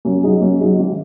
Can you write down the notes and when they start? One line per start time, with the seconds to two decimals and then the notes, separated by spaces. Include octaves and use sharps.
0.05 F#2
0.23 F#3 D#4 G#4
0.41 F#2
0.60 F#3 D#4 G#4
0.78 G#1